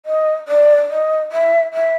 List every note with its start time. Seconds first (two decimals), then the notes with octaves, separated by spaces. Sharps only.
0.06 D#5
0.48 D5
0.90 D#5
1.32 E5
1.73 E5